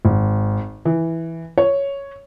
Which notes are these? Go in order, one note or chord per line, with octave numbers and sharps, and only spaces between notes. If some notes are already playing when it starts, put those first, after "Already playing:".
G#1
E3
C#5